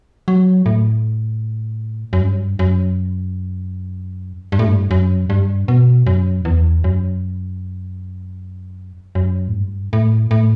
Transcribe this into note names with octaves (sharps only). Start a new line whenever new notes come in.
F#3
A2
F#2
G2
F#2
G2
A2
G2
F#2
G2
B2
F#2
E2
F#2
F#2
A2
G2
A2
A2